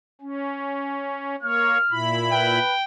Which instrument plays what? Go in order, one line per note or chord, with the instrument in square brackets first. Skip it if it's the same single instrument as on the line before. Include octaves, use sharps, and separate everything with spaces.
[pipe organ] C#4
[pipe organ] A#3 C#5 [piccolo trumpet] F6
[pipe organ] A#2 E4 B5
[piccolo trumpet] B4 [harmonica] G5